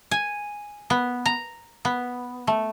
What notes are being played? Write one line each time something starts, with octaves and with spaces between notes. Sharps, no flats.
G#5
B3
A#5
B3
A3